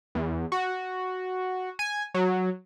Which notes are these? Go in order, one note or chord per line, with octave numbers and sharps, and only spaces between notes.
E2
F#4
G#5
F#3